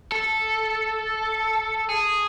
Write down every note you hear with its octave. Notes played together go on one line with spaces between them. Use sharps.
A4
G#4